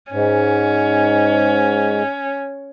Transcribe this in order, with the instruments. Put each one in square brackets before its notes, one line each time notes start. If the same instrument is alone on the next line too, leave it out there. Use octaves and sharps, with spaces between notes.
[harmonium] G#2 [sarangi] C#4